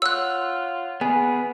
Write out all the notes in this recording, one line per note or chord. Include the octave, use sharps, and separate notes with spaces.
F4 C#5 F#5 C6 E6 F#6
B3 G#4 B4 G#5